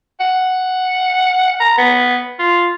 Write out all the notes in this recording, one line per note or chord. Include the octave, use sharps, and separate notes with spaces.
F#5
A#5
B3
F4